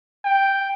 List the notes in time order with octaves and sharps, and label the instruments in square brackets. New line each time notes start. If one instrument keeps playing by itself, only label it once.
[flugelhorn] G5